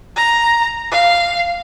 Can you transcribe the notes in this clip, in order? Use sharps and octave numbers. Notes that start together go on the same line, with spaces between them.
A#5
F5